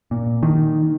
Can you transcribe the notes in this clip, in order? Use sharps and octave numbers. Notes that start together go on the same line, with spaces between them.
A#2
D#3